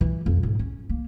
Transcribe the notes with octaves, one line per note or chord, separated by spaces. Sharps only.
E3
F2
G#2
C#4
A#3